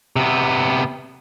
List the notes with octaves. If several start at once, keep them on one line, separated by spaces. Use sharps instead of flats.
C3 B3